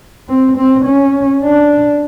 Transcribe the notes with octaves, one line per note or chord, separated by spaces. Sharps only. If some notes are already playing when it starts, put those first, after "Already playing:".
C4
C4
C#4
D4